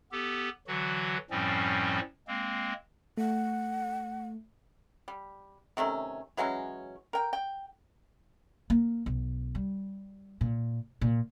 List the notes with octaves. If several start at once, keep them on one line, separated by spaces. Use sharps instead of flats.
B3 G4 A4
D3 E3 F#3 F#4
F#2 A2 F3 G3 C4 C#4
G#3 A#3 C4
A3 F#5
G3
C3 D#3 A3 C#4
E3 F#3 G#3 C#4
A#4 G5
G5
A#3
B1
G3
A#2
A#2